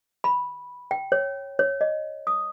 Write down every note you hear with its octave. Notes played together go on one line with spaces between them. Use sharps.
B5
G5
C#5
C#5
D#5
D#6